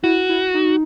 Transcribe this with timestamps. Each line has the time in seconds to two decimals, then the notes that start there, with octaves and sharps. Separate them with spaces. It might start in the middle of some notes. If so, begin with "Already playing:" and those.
0.03 E4 F#4
0.29 E4
0.54 D#4